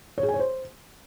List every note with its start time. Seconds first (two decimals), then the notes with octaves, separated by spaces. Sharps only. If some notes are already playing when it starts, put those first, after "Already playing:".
0.18 C#5
0.23 G#4
0.29 G#5
0.34 C#5
0.39 C5